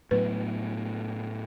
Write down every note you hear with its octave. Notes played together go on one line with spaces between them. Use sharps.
A2 F#3 B3 B4